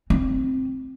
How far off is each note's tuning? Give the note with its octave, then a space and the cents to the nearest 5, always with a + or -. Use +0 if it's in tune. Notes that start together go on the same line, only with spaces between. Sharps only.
C4 +0 D#4 -5